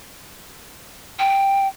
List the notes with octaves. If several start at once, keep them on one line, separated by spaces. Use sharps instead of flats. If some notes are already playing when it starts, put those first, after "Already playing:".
G5